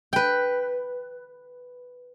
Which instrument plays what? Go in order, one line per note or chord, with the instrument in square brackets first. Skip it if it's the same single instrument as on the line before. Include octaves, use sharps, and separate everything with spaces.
[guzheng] B4 G5